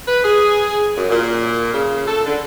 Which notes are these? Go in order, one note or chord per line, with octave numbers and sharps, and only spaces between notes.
B4
G#4
F#2
A#2
C#3
A4
D3